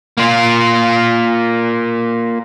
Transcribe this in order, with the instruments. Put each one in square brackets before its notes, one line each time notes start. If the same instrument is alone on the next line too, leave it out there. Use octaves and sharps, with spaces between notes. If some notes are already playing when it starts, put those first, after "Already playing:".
[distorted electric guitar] A#3 F4